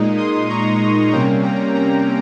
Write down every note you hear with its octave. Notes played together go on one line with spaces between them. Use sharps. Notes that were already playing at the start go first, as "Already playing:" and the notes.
Already playing: A#2 G#3 D#4
C6 D#6
A#5 C#6
C3 G3 A#3 C#4 G5 A#5
G5 A#5
G5 A#5